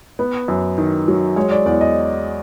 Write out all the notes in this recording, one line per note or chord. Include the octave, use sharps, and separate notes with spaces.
B3
F#2
D#3
F#3
G#3 C#5
D5
E2 D5
D#5